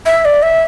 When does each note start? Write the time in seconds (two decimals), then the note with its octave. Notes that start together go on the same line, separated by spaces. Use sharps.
0.06 E5
0.25 D5
0.42 E5